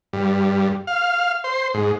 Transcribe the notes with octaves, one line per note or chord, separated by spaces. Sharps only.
G2
F5
C5
G#2